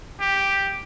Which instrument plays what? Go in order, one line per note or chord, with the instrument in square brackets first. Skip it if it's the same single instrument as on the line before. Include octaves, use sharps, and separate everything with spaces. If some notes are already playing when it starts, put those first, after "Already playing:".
[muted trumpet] G4